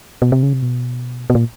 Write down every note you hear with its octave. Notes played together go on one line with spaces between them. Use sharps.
B2
C3
C#3
C3
B2
B2
A#2